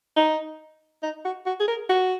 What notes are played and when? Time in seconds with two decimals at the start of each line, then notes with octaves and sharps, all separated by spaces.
0.17 D#4
1.03 D#4
1.25 F#4
1.46 F#4
1.60 G#4
1.68 A#4
1.89 F#4